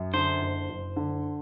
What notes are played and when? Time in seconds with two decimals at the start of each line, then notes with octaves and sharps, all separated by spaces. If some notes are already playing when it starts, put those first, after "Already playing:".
Already playing: F#2
0.13 D3 C5
0.41 F#1
0.69 F#1
0.96 D3